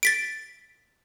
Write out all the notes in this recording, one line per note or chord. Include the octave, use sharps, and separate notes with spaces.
A6 B6 D7